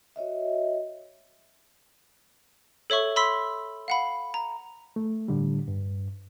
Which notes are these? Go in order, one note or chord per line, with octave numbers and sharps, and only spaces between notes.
F#4 C#5 D#5 E5
A4 C#5 E5 C#6
B5 C6 E6 B6
F5 F#5 B5
A#5
A3
A2 D3 G3
G2